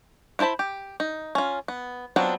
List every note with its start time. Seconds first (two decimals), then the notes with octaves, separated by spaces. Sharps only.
0.39 B3 E4 C5 A5 B5
0.59 G4
1.00 D#4
1.35 C#4 F4
1.68 B3
2.16 F#3 B3 C4 D4 F4